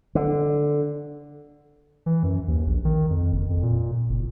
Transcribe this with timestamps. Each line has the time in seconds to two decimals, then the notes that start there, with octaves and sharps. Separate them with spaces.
0.15 D3
2.06 E3
2.23 F#2
2.48 D#2
2.67 A#1
2.85 D#3
3.10 F2
3.32 F#1
3.50 F2
3.63 A#2
4.09 F#1